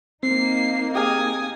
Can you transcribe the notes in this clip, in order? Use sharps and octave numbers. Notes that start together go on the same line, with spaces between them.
A#3 C4 D#4 C7
G4 G#4 F5 G#5 D#6